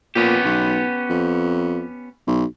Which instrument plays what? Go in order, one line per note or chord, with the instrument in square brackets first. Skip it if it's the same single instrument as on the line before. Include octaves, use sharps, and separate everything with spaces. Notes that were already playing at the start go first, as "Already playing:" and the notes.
[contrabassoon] A#2 [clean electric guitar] B3 C#4 G4
[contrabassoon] B1
F2
B1